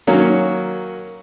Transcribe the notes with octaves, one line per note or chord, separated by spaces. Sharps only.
D#3 F#3 A#3 C#4